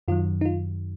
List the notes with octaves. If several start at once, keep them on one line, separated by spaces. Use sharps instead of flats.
F#2 D#3 F#3 F4
D#4
F4